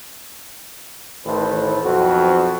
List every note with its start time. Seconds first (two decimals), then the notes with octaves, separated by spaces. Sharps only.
1.26 A1 A2 D#3 A4 B4 C5
1.82 B1 F2 F3 C4 F#4